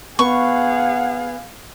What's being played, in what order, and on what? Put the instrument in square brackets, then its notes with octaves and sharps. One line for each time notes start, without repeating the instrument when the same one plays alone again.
[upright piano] B3 [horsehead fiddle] G#4 F5 [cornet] F#5 [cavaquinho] C#6